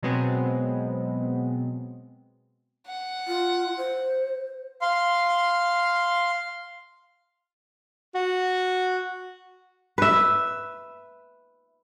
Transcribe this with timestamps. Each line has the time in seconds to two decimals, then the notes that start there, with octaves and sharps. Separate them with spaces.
0.03 B2 F#3 G#3 B3 C4
2.87 F#5
3.28 F4
3.78 C5
4.82 F5 C6
8.15 F#4
9.98 B4 E5